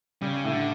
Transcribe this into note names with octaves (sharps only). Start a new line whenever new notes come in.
C#3 G3
A2
D3